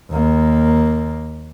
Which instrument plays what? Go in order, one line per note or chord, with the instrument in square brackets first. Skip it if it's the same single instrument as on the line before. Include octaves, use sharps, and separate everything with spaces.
[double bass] D#2 A#3